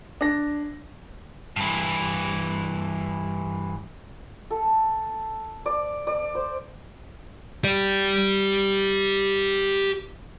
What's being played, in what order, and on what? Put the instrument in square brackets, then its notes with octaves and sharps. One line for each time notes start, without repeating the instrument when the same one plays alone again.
[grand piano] D4 A#6
[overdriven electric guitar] G2 E3
[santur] A4
D5
D5
C5
[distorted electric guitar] G4 D5